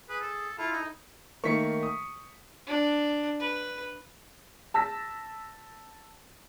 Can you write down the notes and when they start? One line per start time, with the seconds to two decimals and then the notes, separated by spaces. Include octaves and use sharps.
0.09 G#4 B4
0.21 A4
0.58 E4 F4 A4
0.72 D#4
1.44 D#3 A3 A#3 C#6 B6 C#7
1.83 D#6
2.67 D4
3.40 B4
4.74 A5 E6 A#6 B6